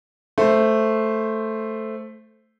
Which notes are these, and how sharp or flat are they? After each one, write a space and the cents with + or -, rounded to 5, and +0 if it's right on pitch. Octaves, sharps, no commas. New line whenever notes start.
A3 +0 C5 +0